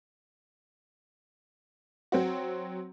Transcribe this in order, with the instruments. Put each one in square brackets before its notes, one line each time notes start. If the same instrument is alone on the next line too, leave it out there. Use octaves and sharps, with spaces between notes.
[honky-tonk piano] F#3 C4 F#4